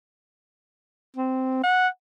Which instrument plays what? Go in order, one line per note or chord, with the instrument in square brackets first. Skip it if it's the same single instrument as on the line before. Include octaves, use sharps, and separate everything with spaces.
[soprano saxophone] C4
F#5